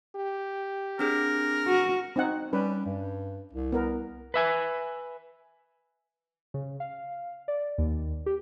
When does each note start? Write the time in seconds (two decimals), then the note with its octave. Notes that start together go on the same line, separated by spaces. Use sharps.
0.16 G4
0.99 C4 D4 G#4 A#4
1.67 F#4
2.16 C4 D#4 F#5
2.53 G3 C#4 B4
2.86 G2
3.53 C2
3.72 B3 A#4
4.34 B4 E5 G#5
6.54 C#3
6.80 F5
7.48 D5
7.78 D#2
8.26 G4